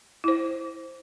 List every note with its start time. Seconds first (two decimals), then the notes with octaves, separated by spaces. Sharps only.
0.24 E4 C5